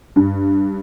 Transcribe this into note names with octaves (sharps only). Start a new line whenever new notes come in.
G2